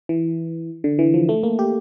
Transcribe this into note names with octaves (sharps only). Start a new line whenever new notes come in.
E3
D3
E3
F3
A3
A#3
G4